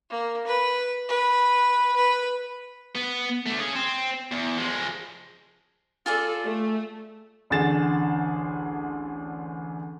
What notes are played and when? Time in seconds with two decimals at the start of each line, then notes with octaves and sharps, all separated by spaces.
0.10 A#3
0.47 B4
1.09 B4
1.96 B4
2.95 B3
3.46 D3 A3
3.59 C#4 G#4
3.75 C4
4.32 E2
4.58 F3 G#3
6.06 F4 G#4 A4 D5
6.44 A3
7.50 A1 D2 D3 G#4 A6 E7